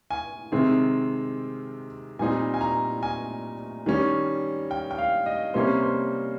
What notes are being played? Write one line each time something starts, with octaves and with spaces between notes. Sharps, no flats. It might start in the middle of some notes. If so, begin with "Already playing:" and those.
G#5
C3 D#3 G#3 C4
A#2 G3 C4 D#4 G#5
G#5
A#5
G#5
D#3 G3 C#4
G5
G5
F5
D#5
C3 G3 A#3 C#4 C5
C5